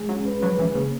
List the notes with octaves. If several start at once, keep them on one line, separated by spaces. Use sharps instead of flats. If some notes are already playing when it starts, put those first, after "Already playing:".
Already playing: G#3 G#4
F#3 C#4
B4
F#3 B4
E3 C#4
C#3 A#3